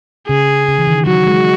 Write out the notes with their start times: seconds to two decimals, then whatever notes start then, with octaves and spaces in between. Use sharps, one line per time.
0.29 C#3 G#4
0.68 C#3
0.78 E3
0.87 D#3
1.06 F#3 F#4
1.27 G#3